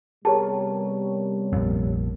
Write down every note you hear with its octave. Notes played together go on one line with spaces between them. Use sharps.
C3 G3 B3 G4 G#4 A#4 C#5 A5
A#1 F2